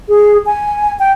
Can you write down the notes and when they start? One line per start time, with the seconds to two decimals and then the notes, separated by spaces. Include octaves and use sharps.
0.09 G#4
0.46 G#5
0.99 G5